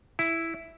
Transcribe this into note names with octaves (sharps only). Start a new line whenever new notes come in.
E4